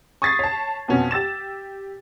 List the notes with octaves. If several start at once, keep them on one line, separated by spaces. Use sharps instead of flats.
C#6 D#6 G#6 A6 B6 C7
C#5 A5
F2 B2 B3 C#4
G4 E6 A6 E7